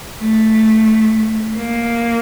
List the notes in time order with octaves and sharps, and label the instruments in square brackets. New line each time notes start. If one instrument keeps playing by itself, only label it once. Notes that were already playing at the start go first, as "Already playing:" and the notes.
[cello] A3
A#3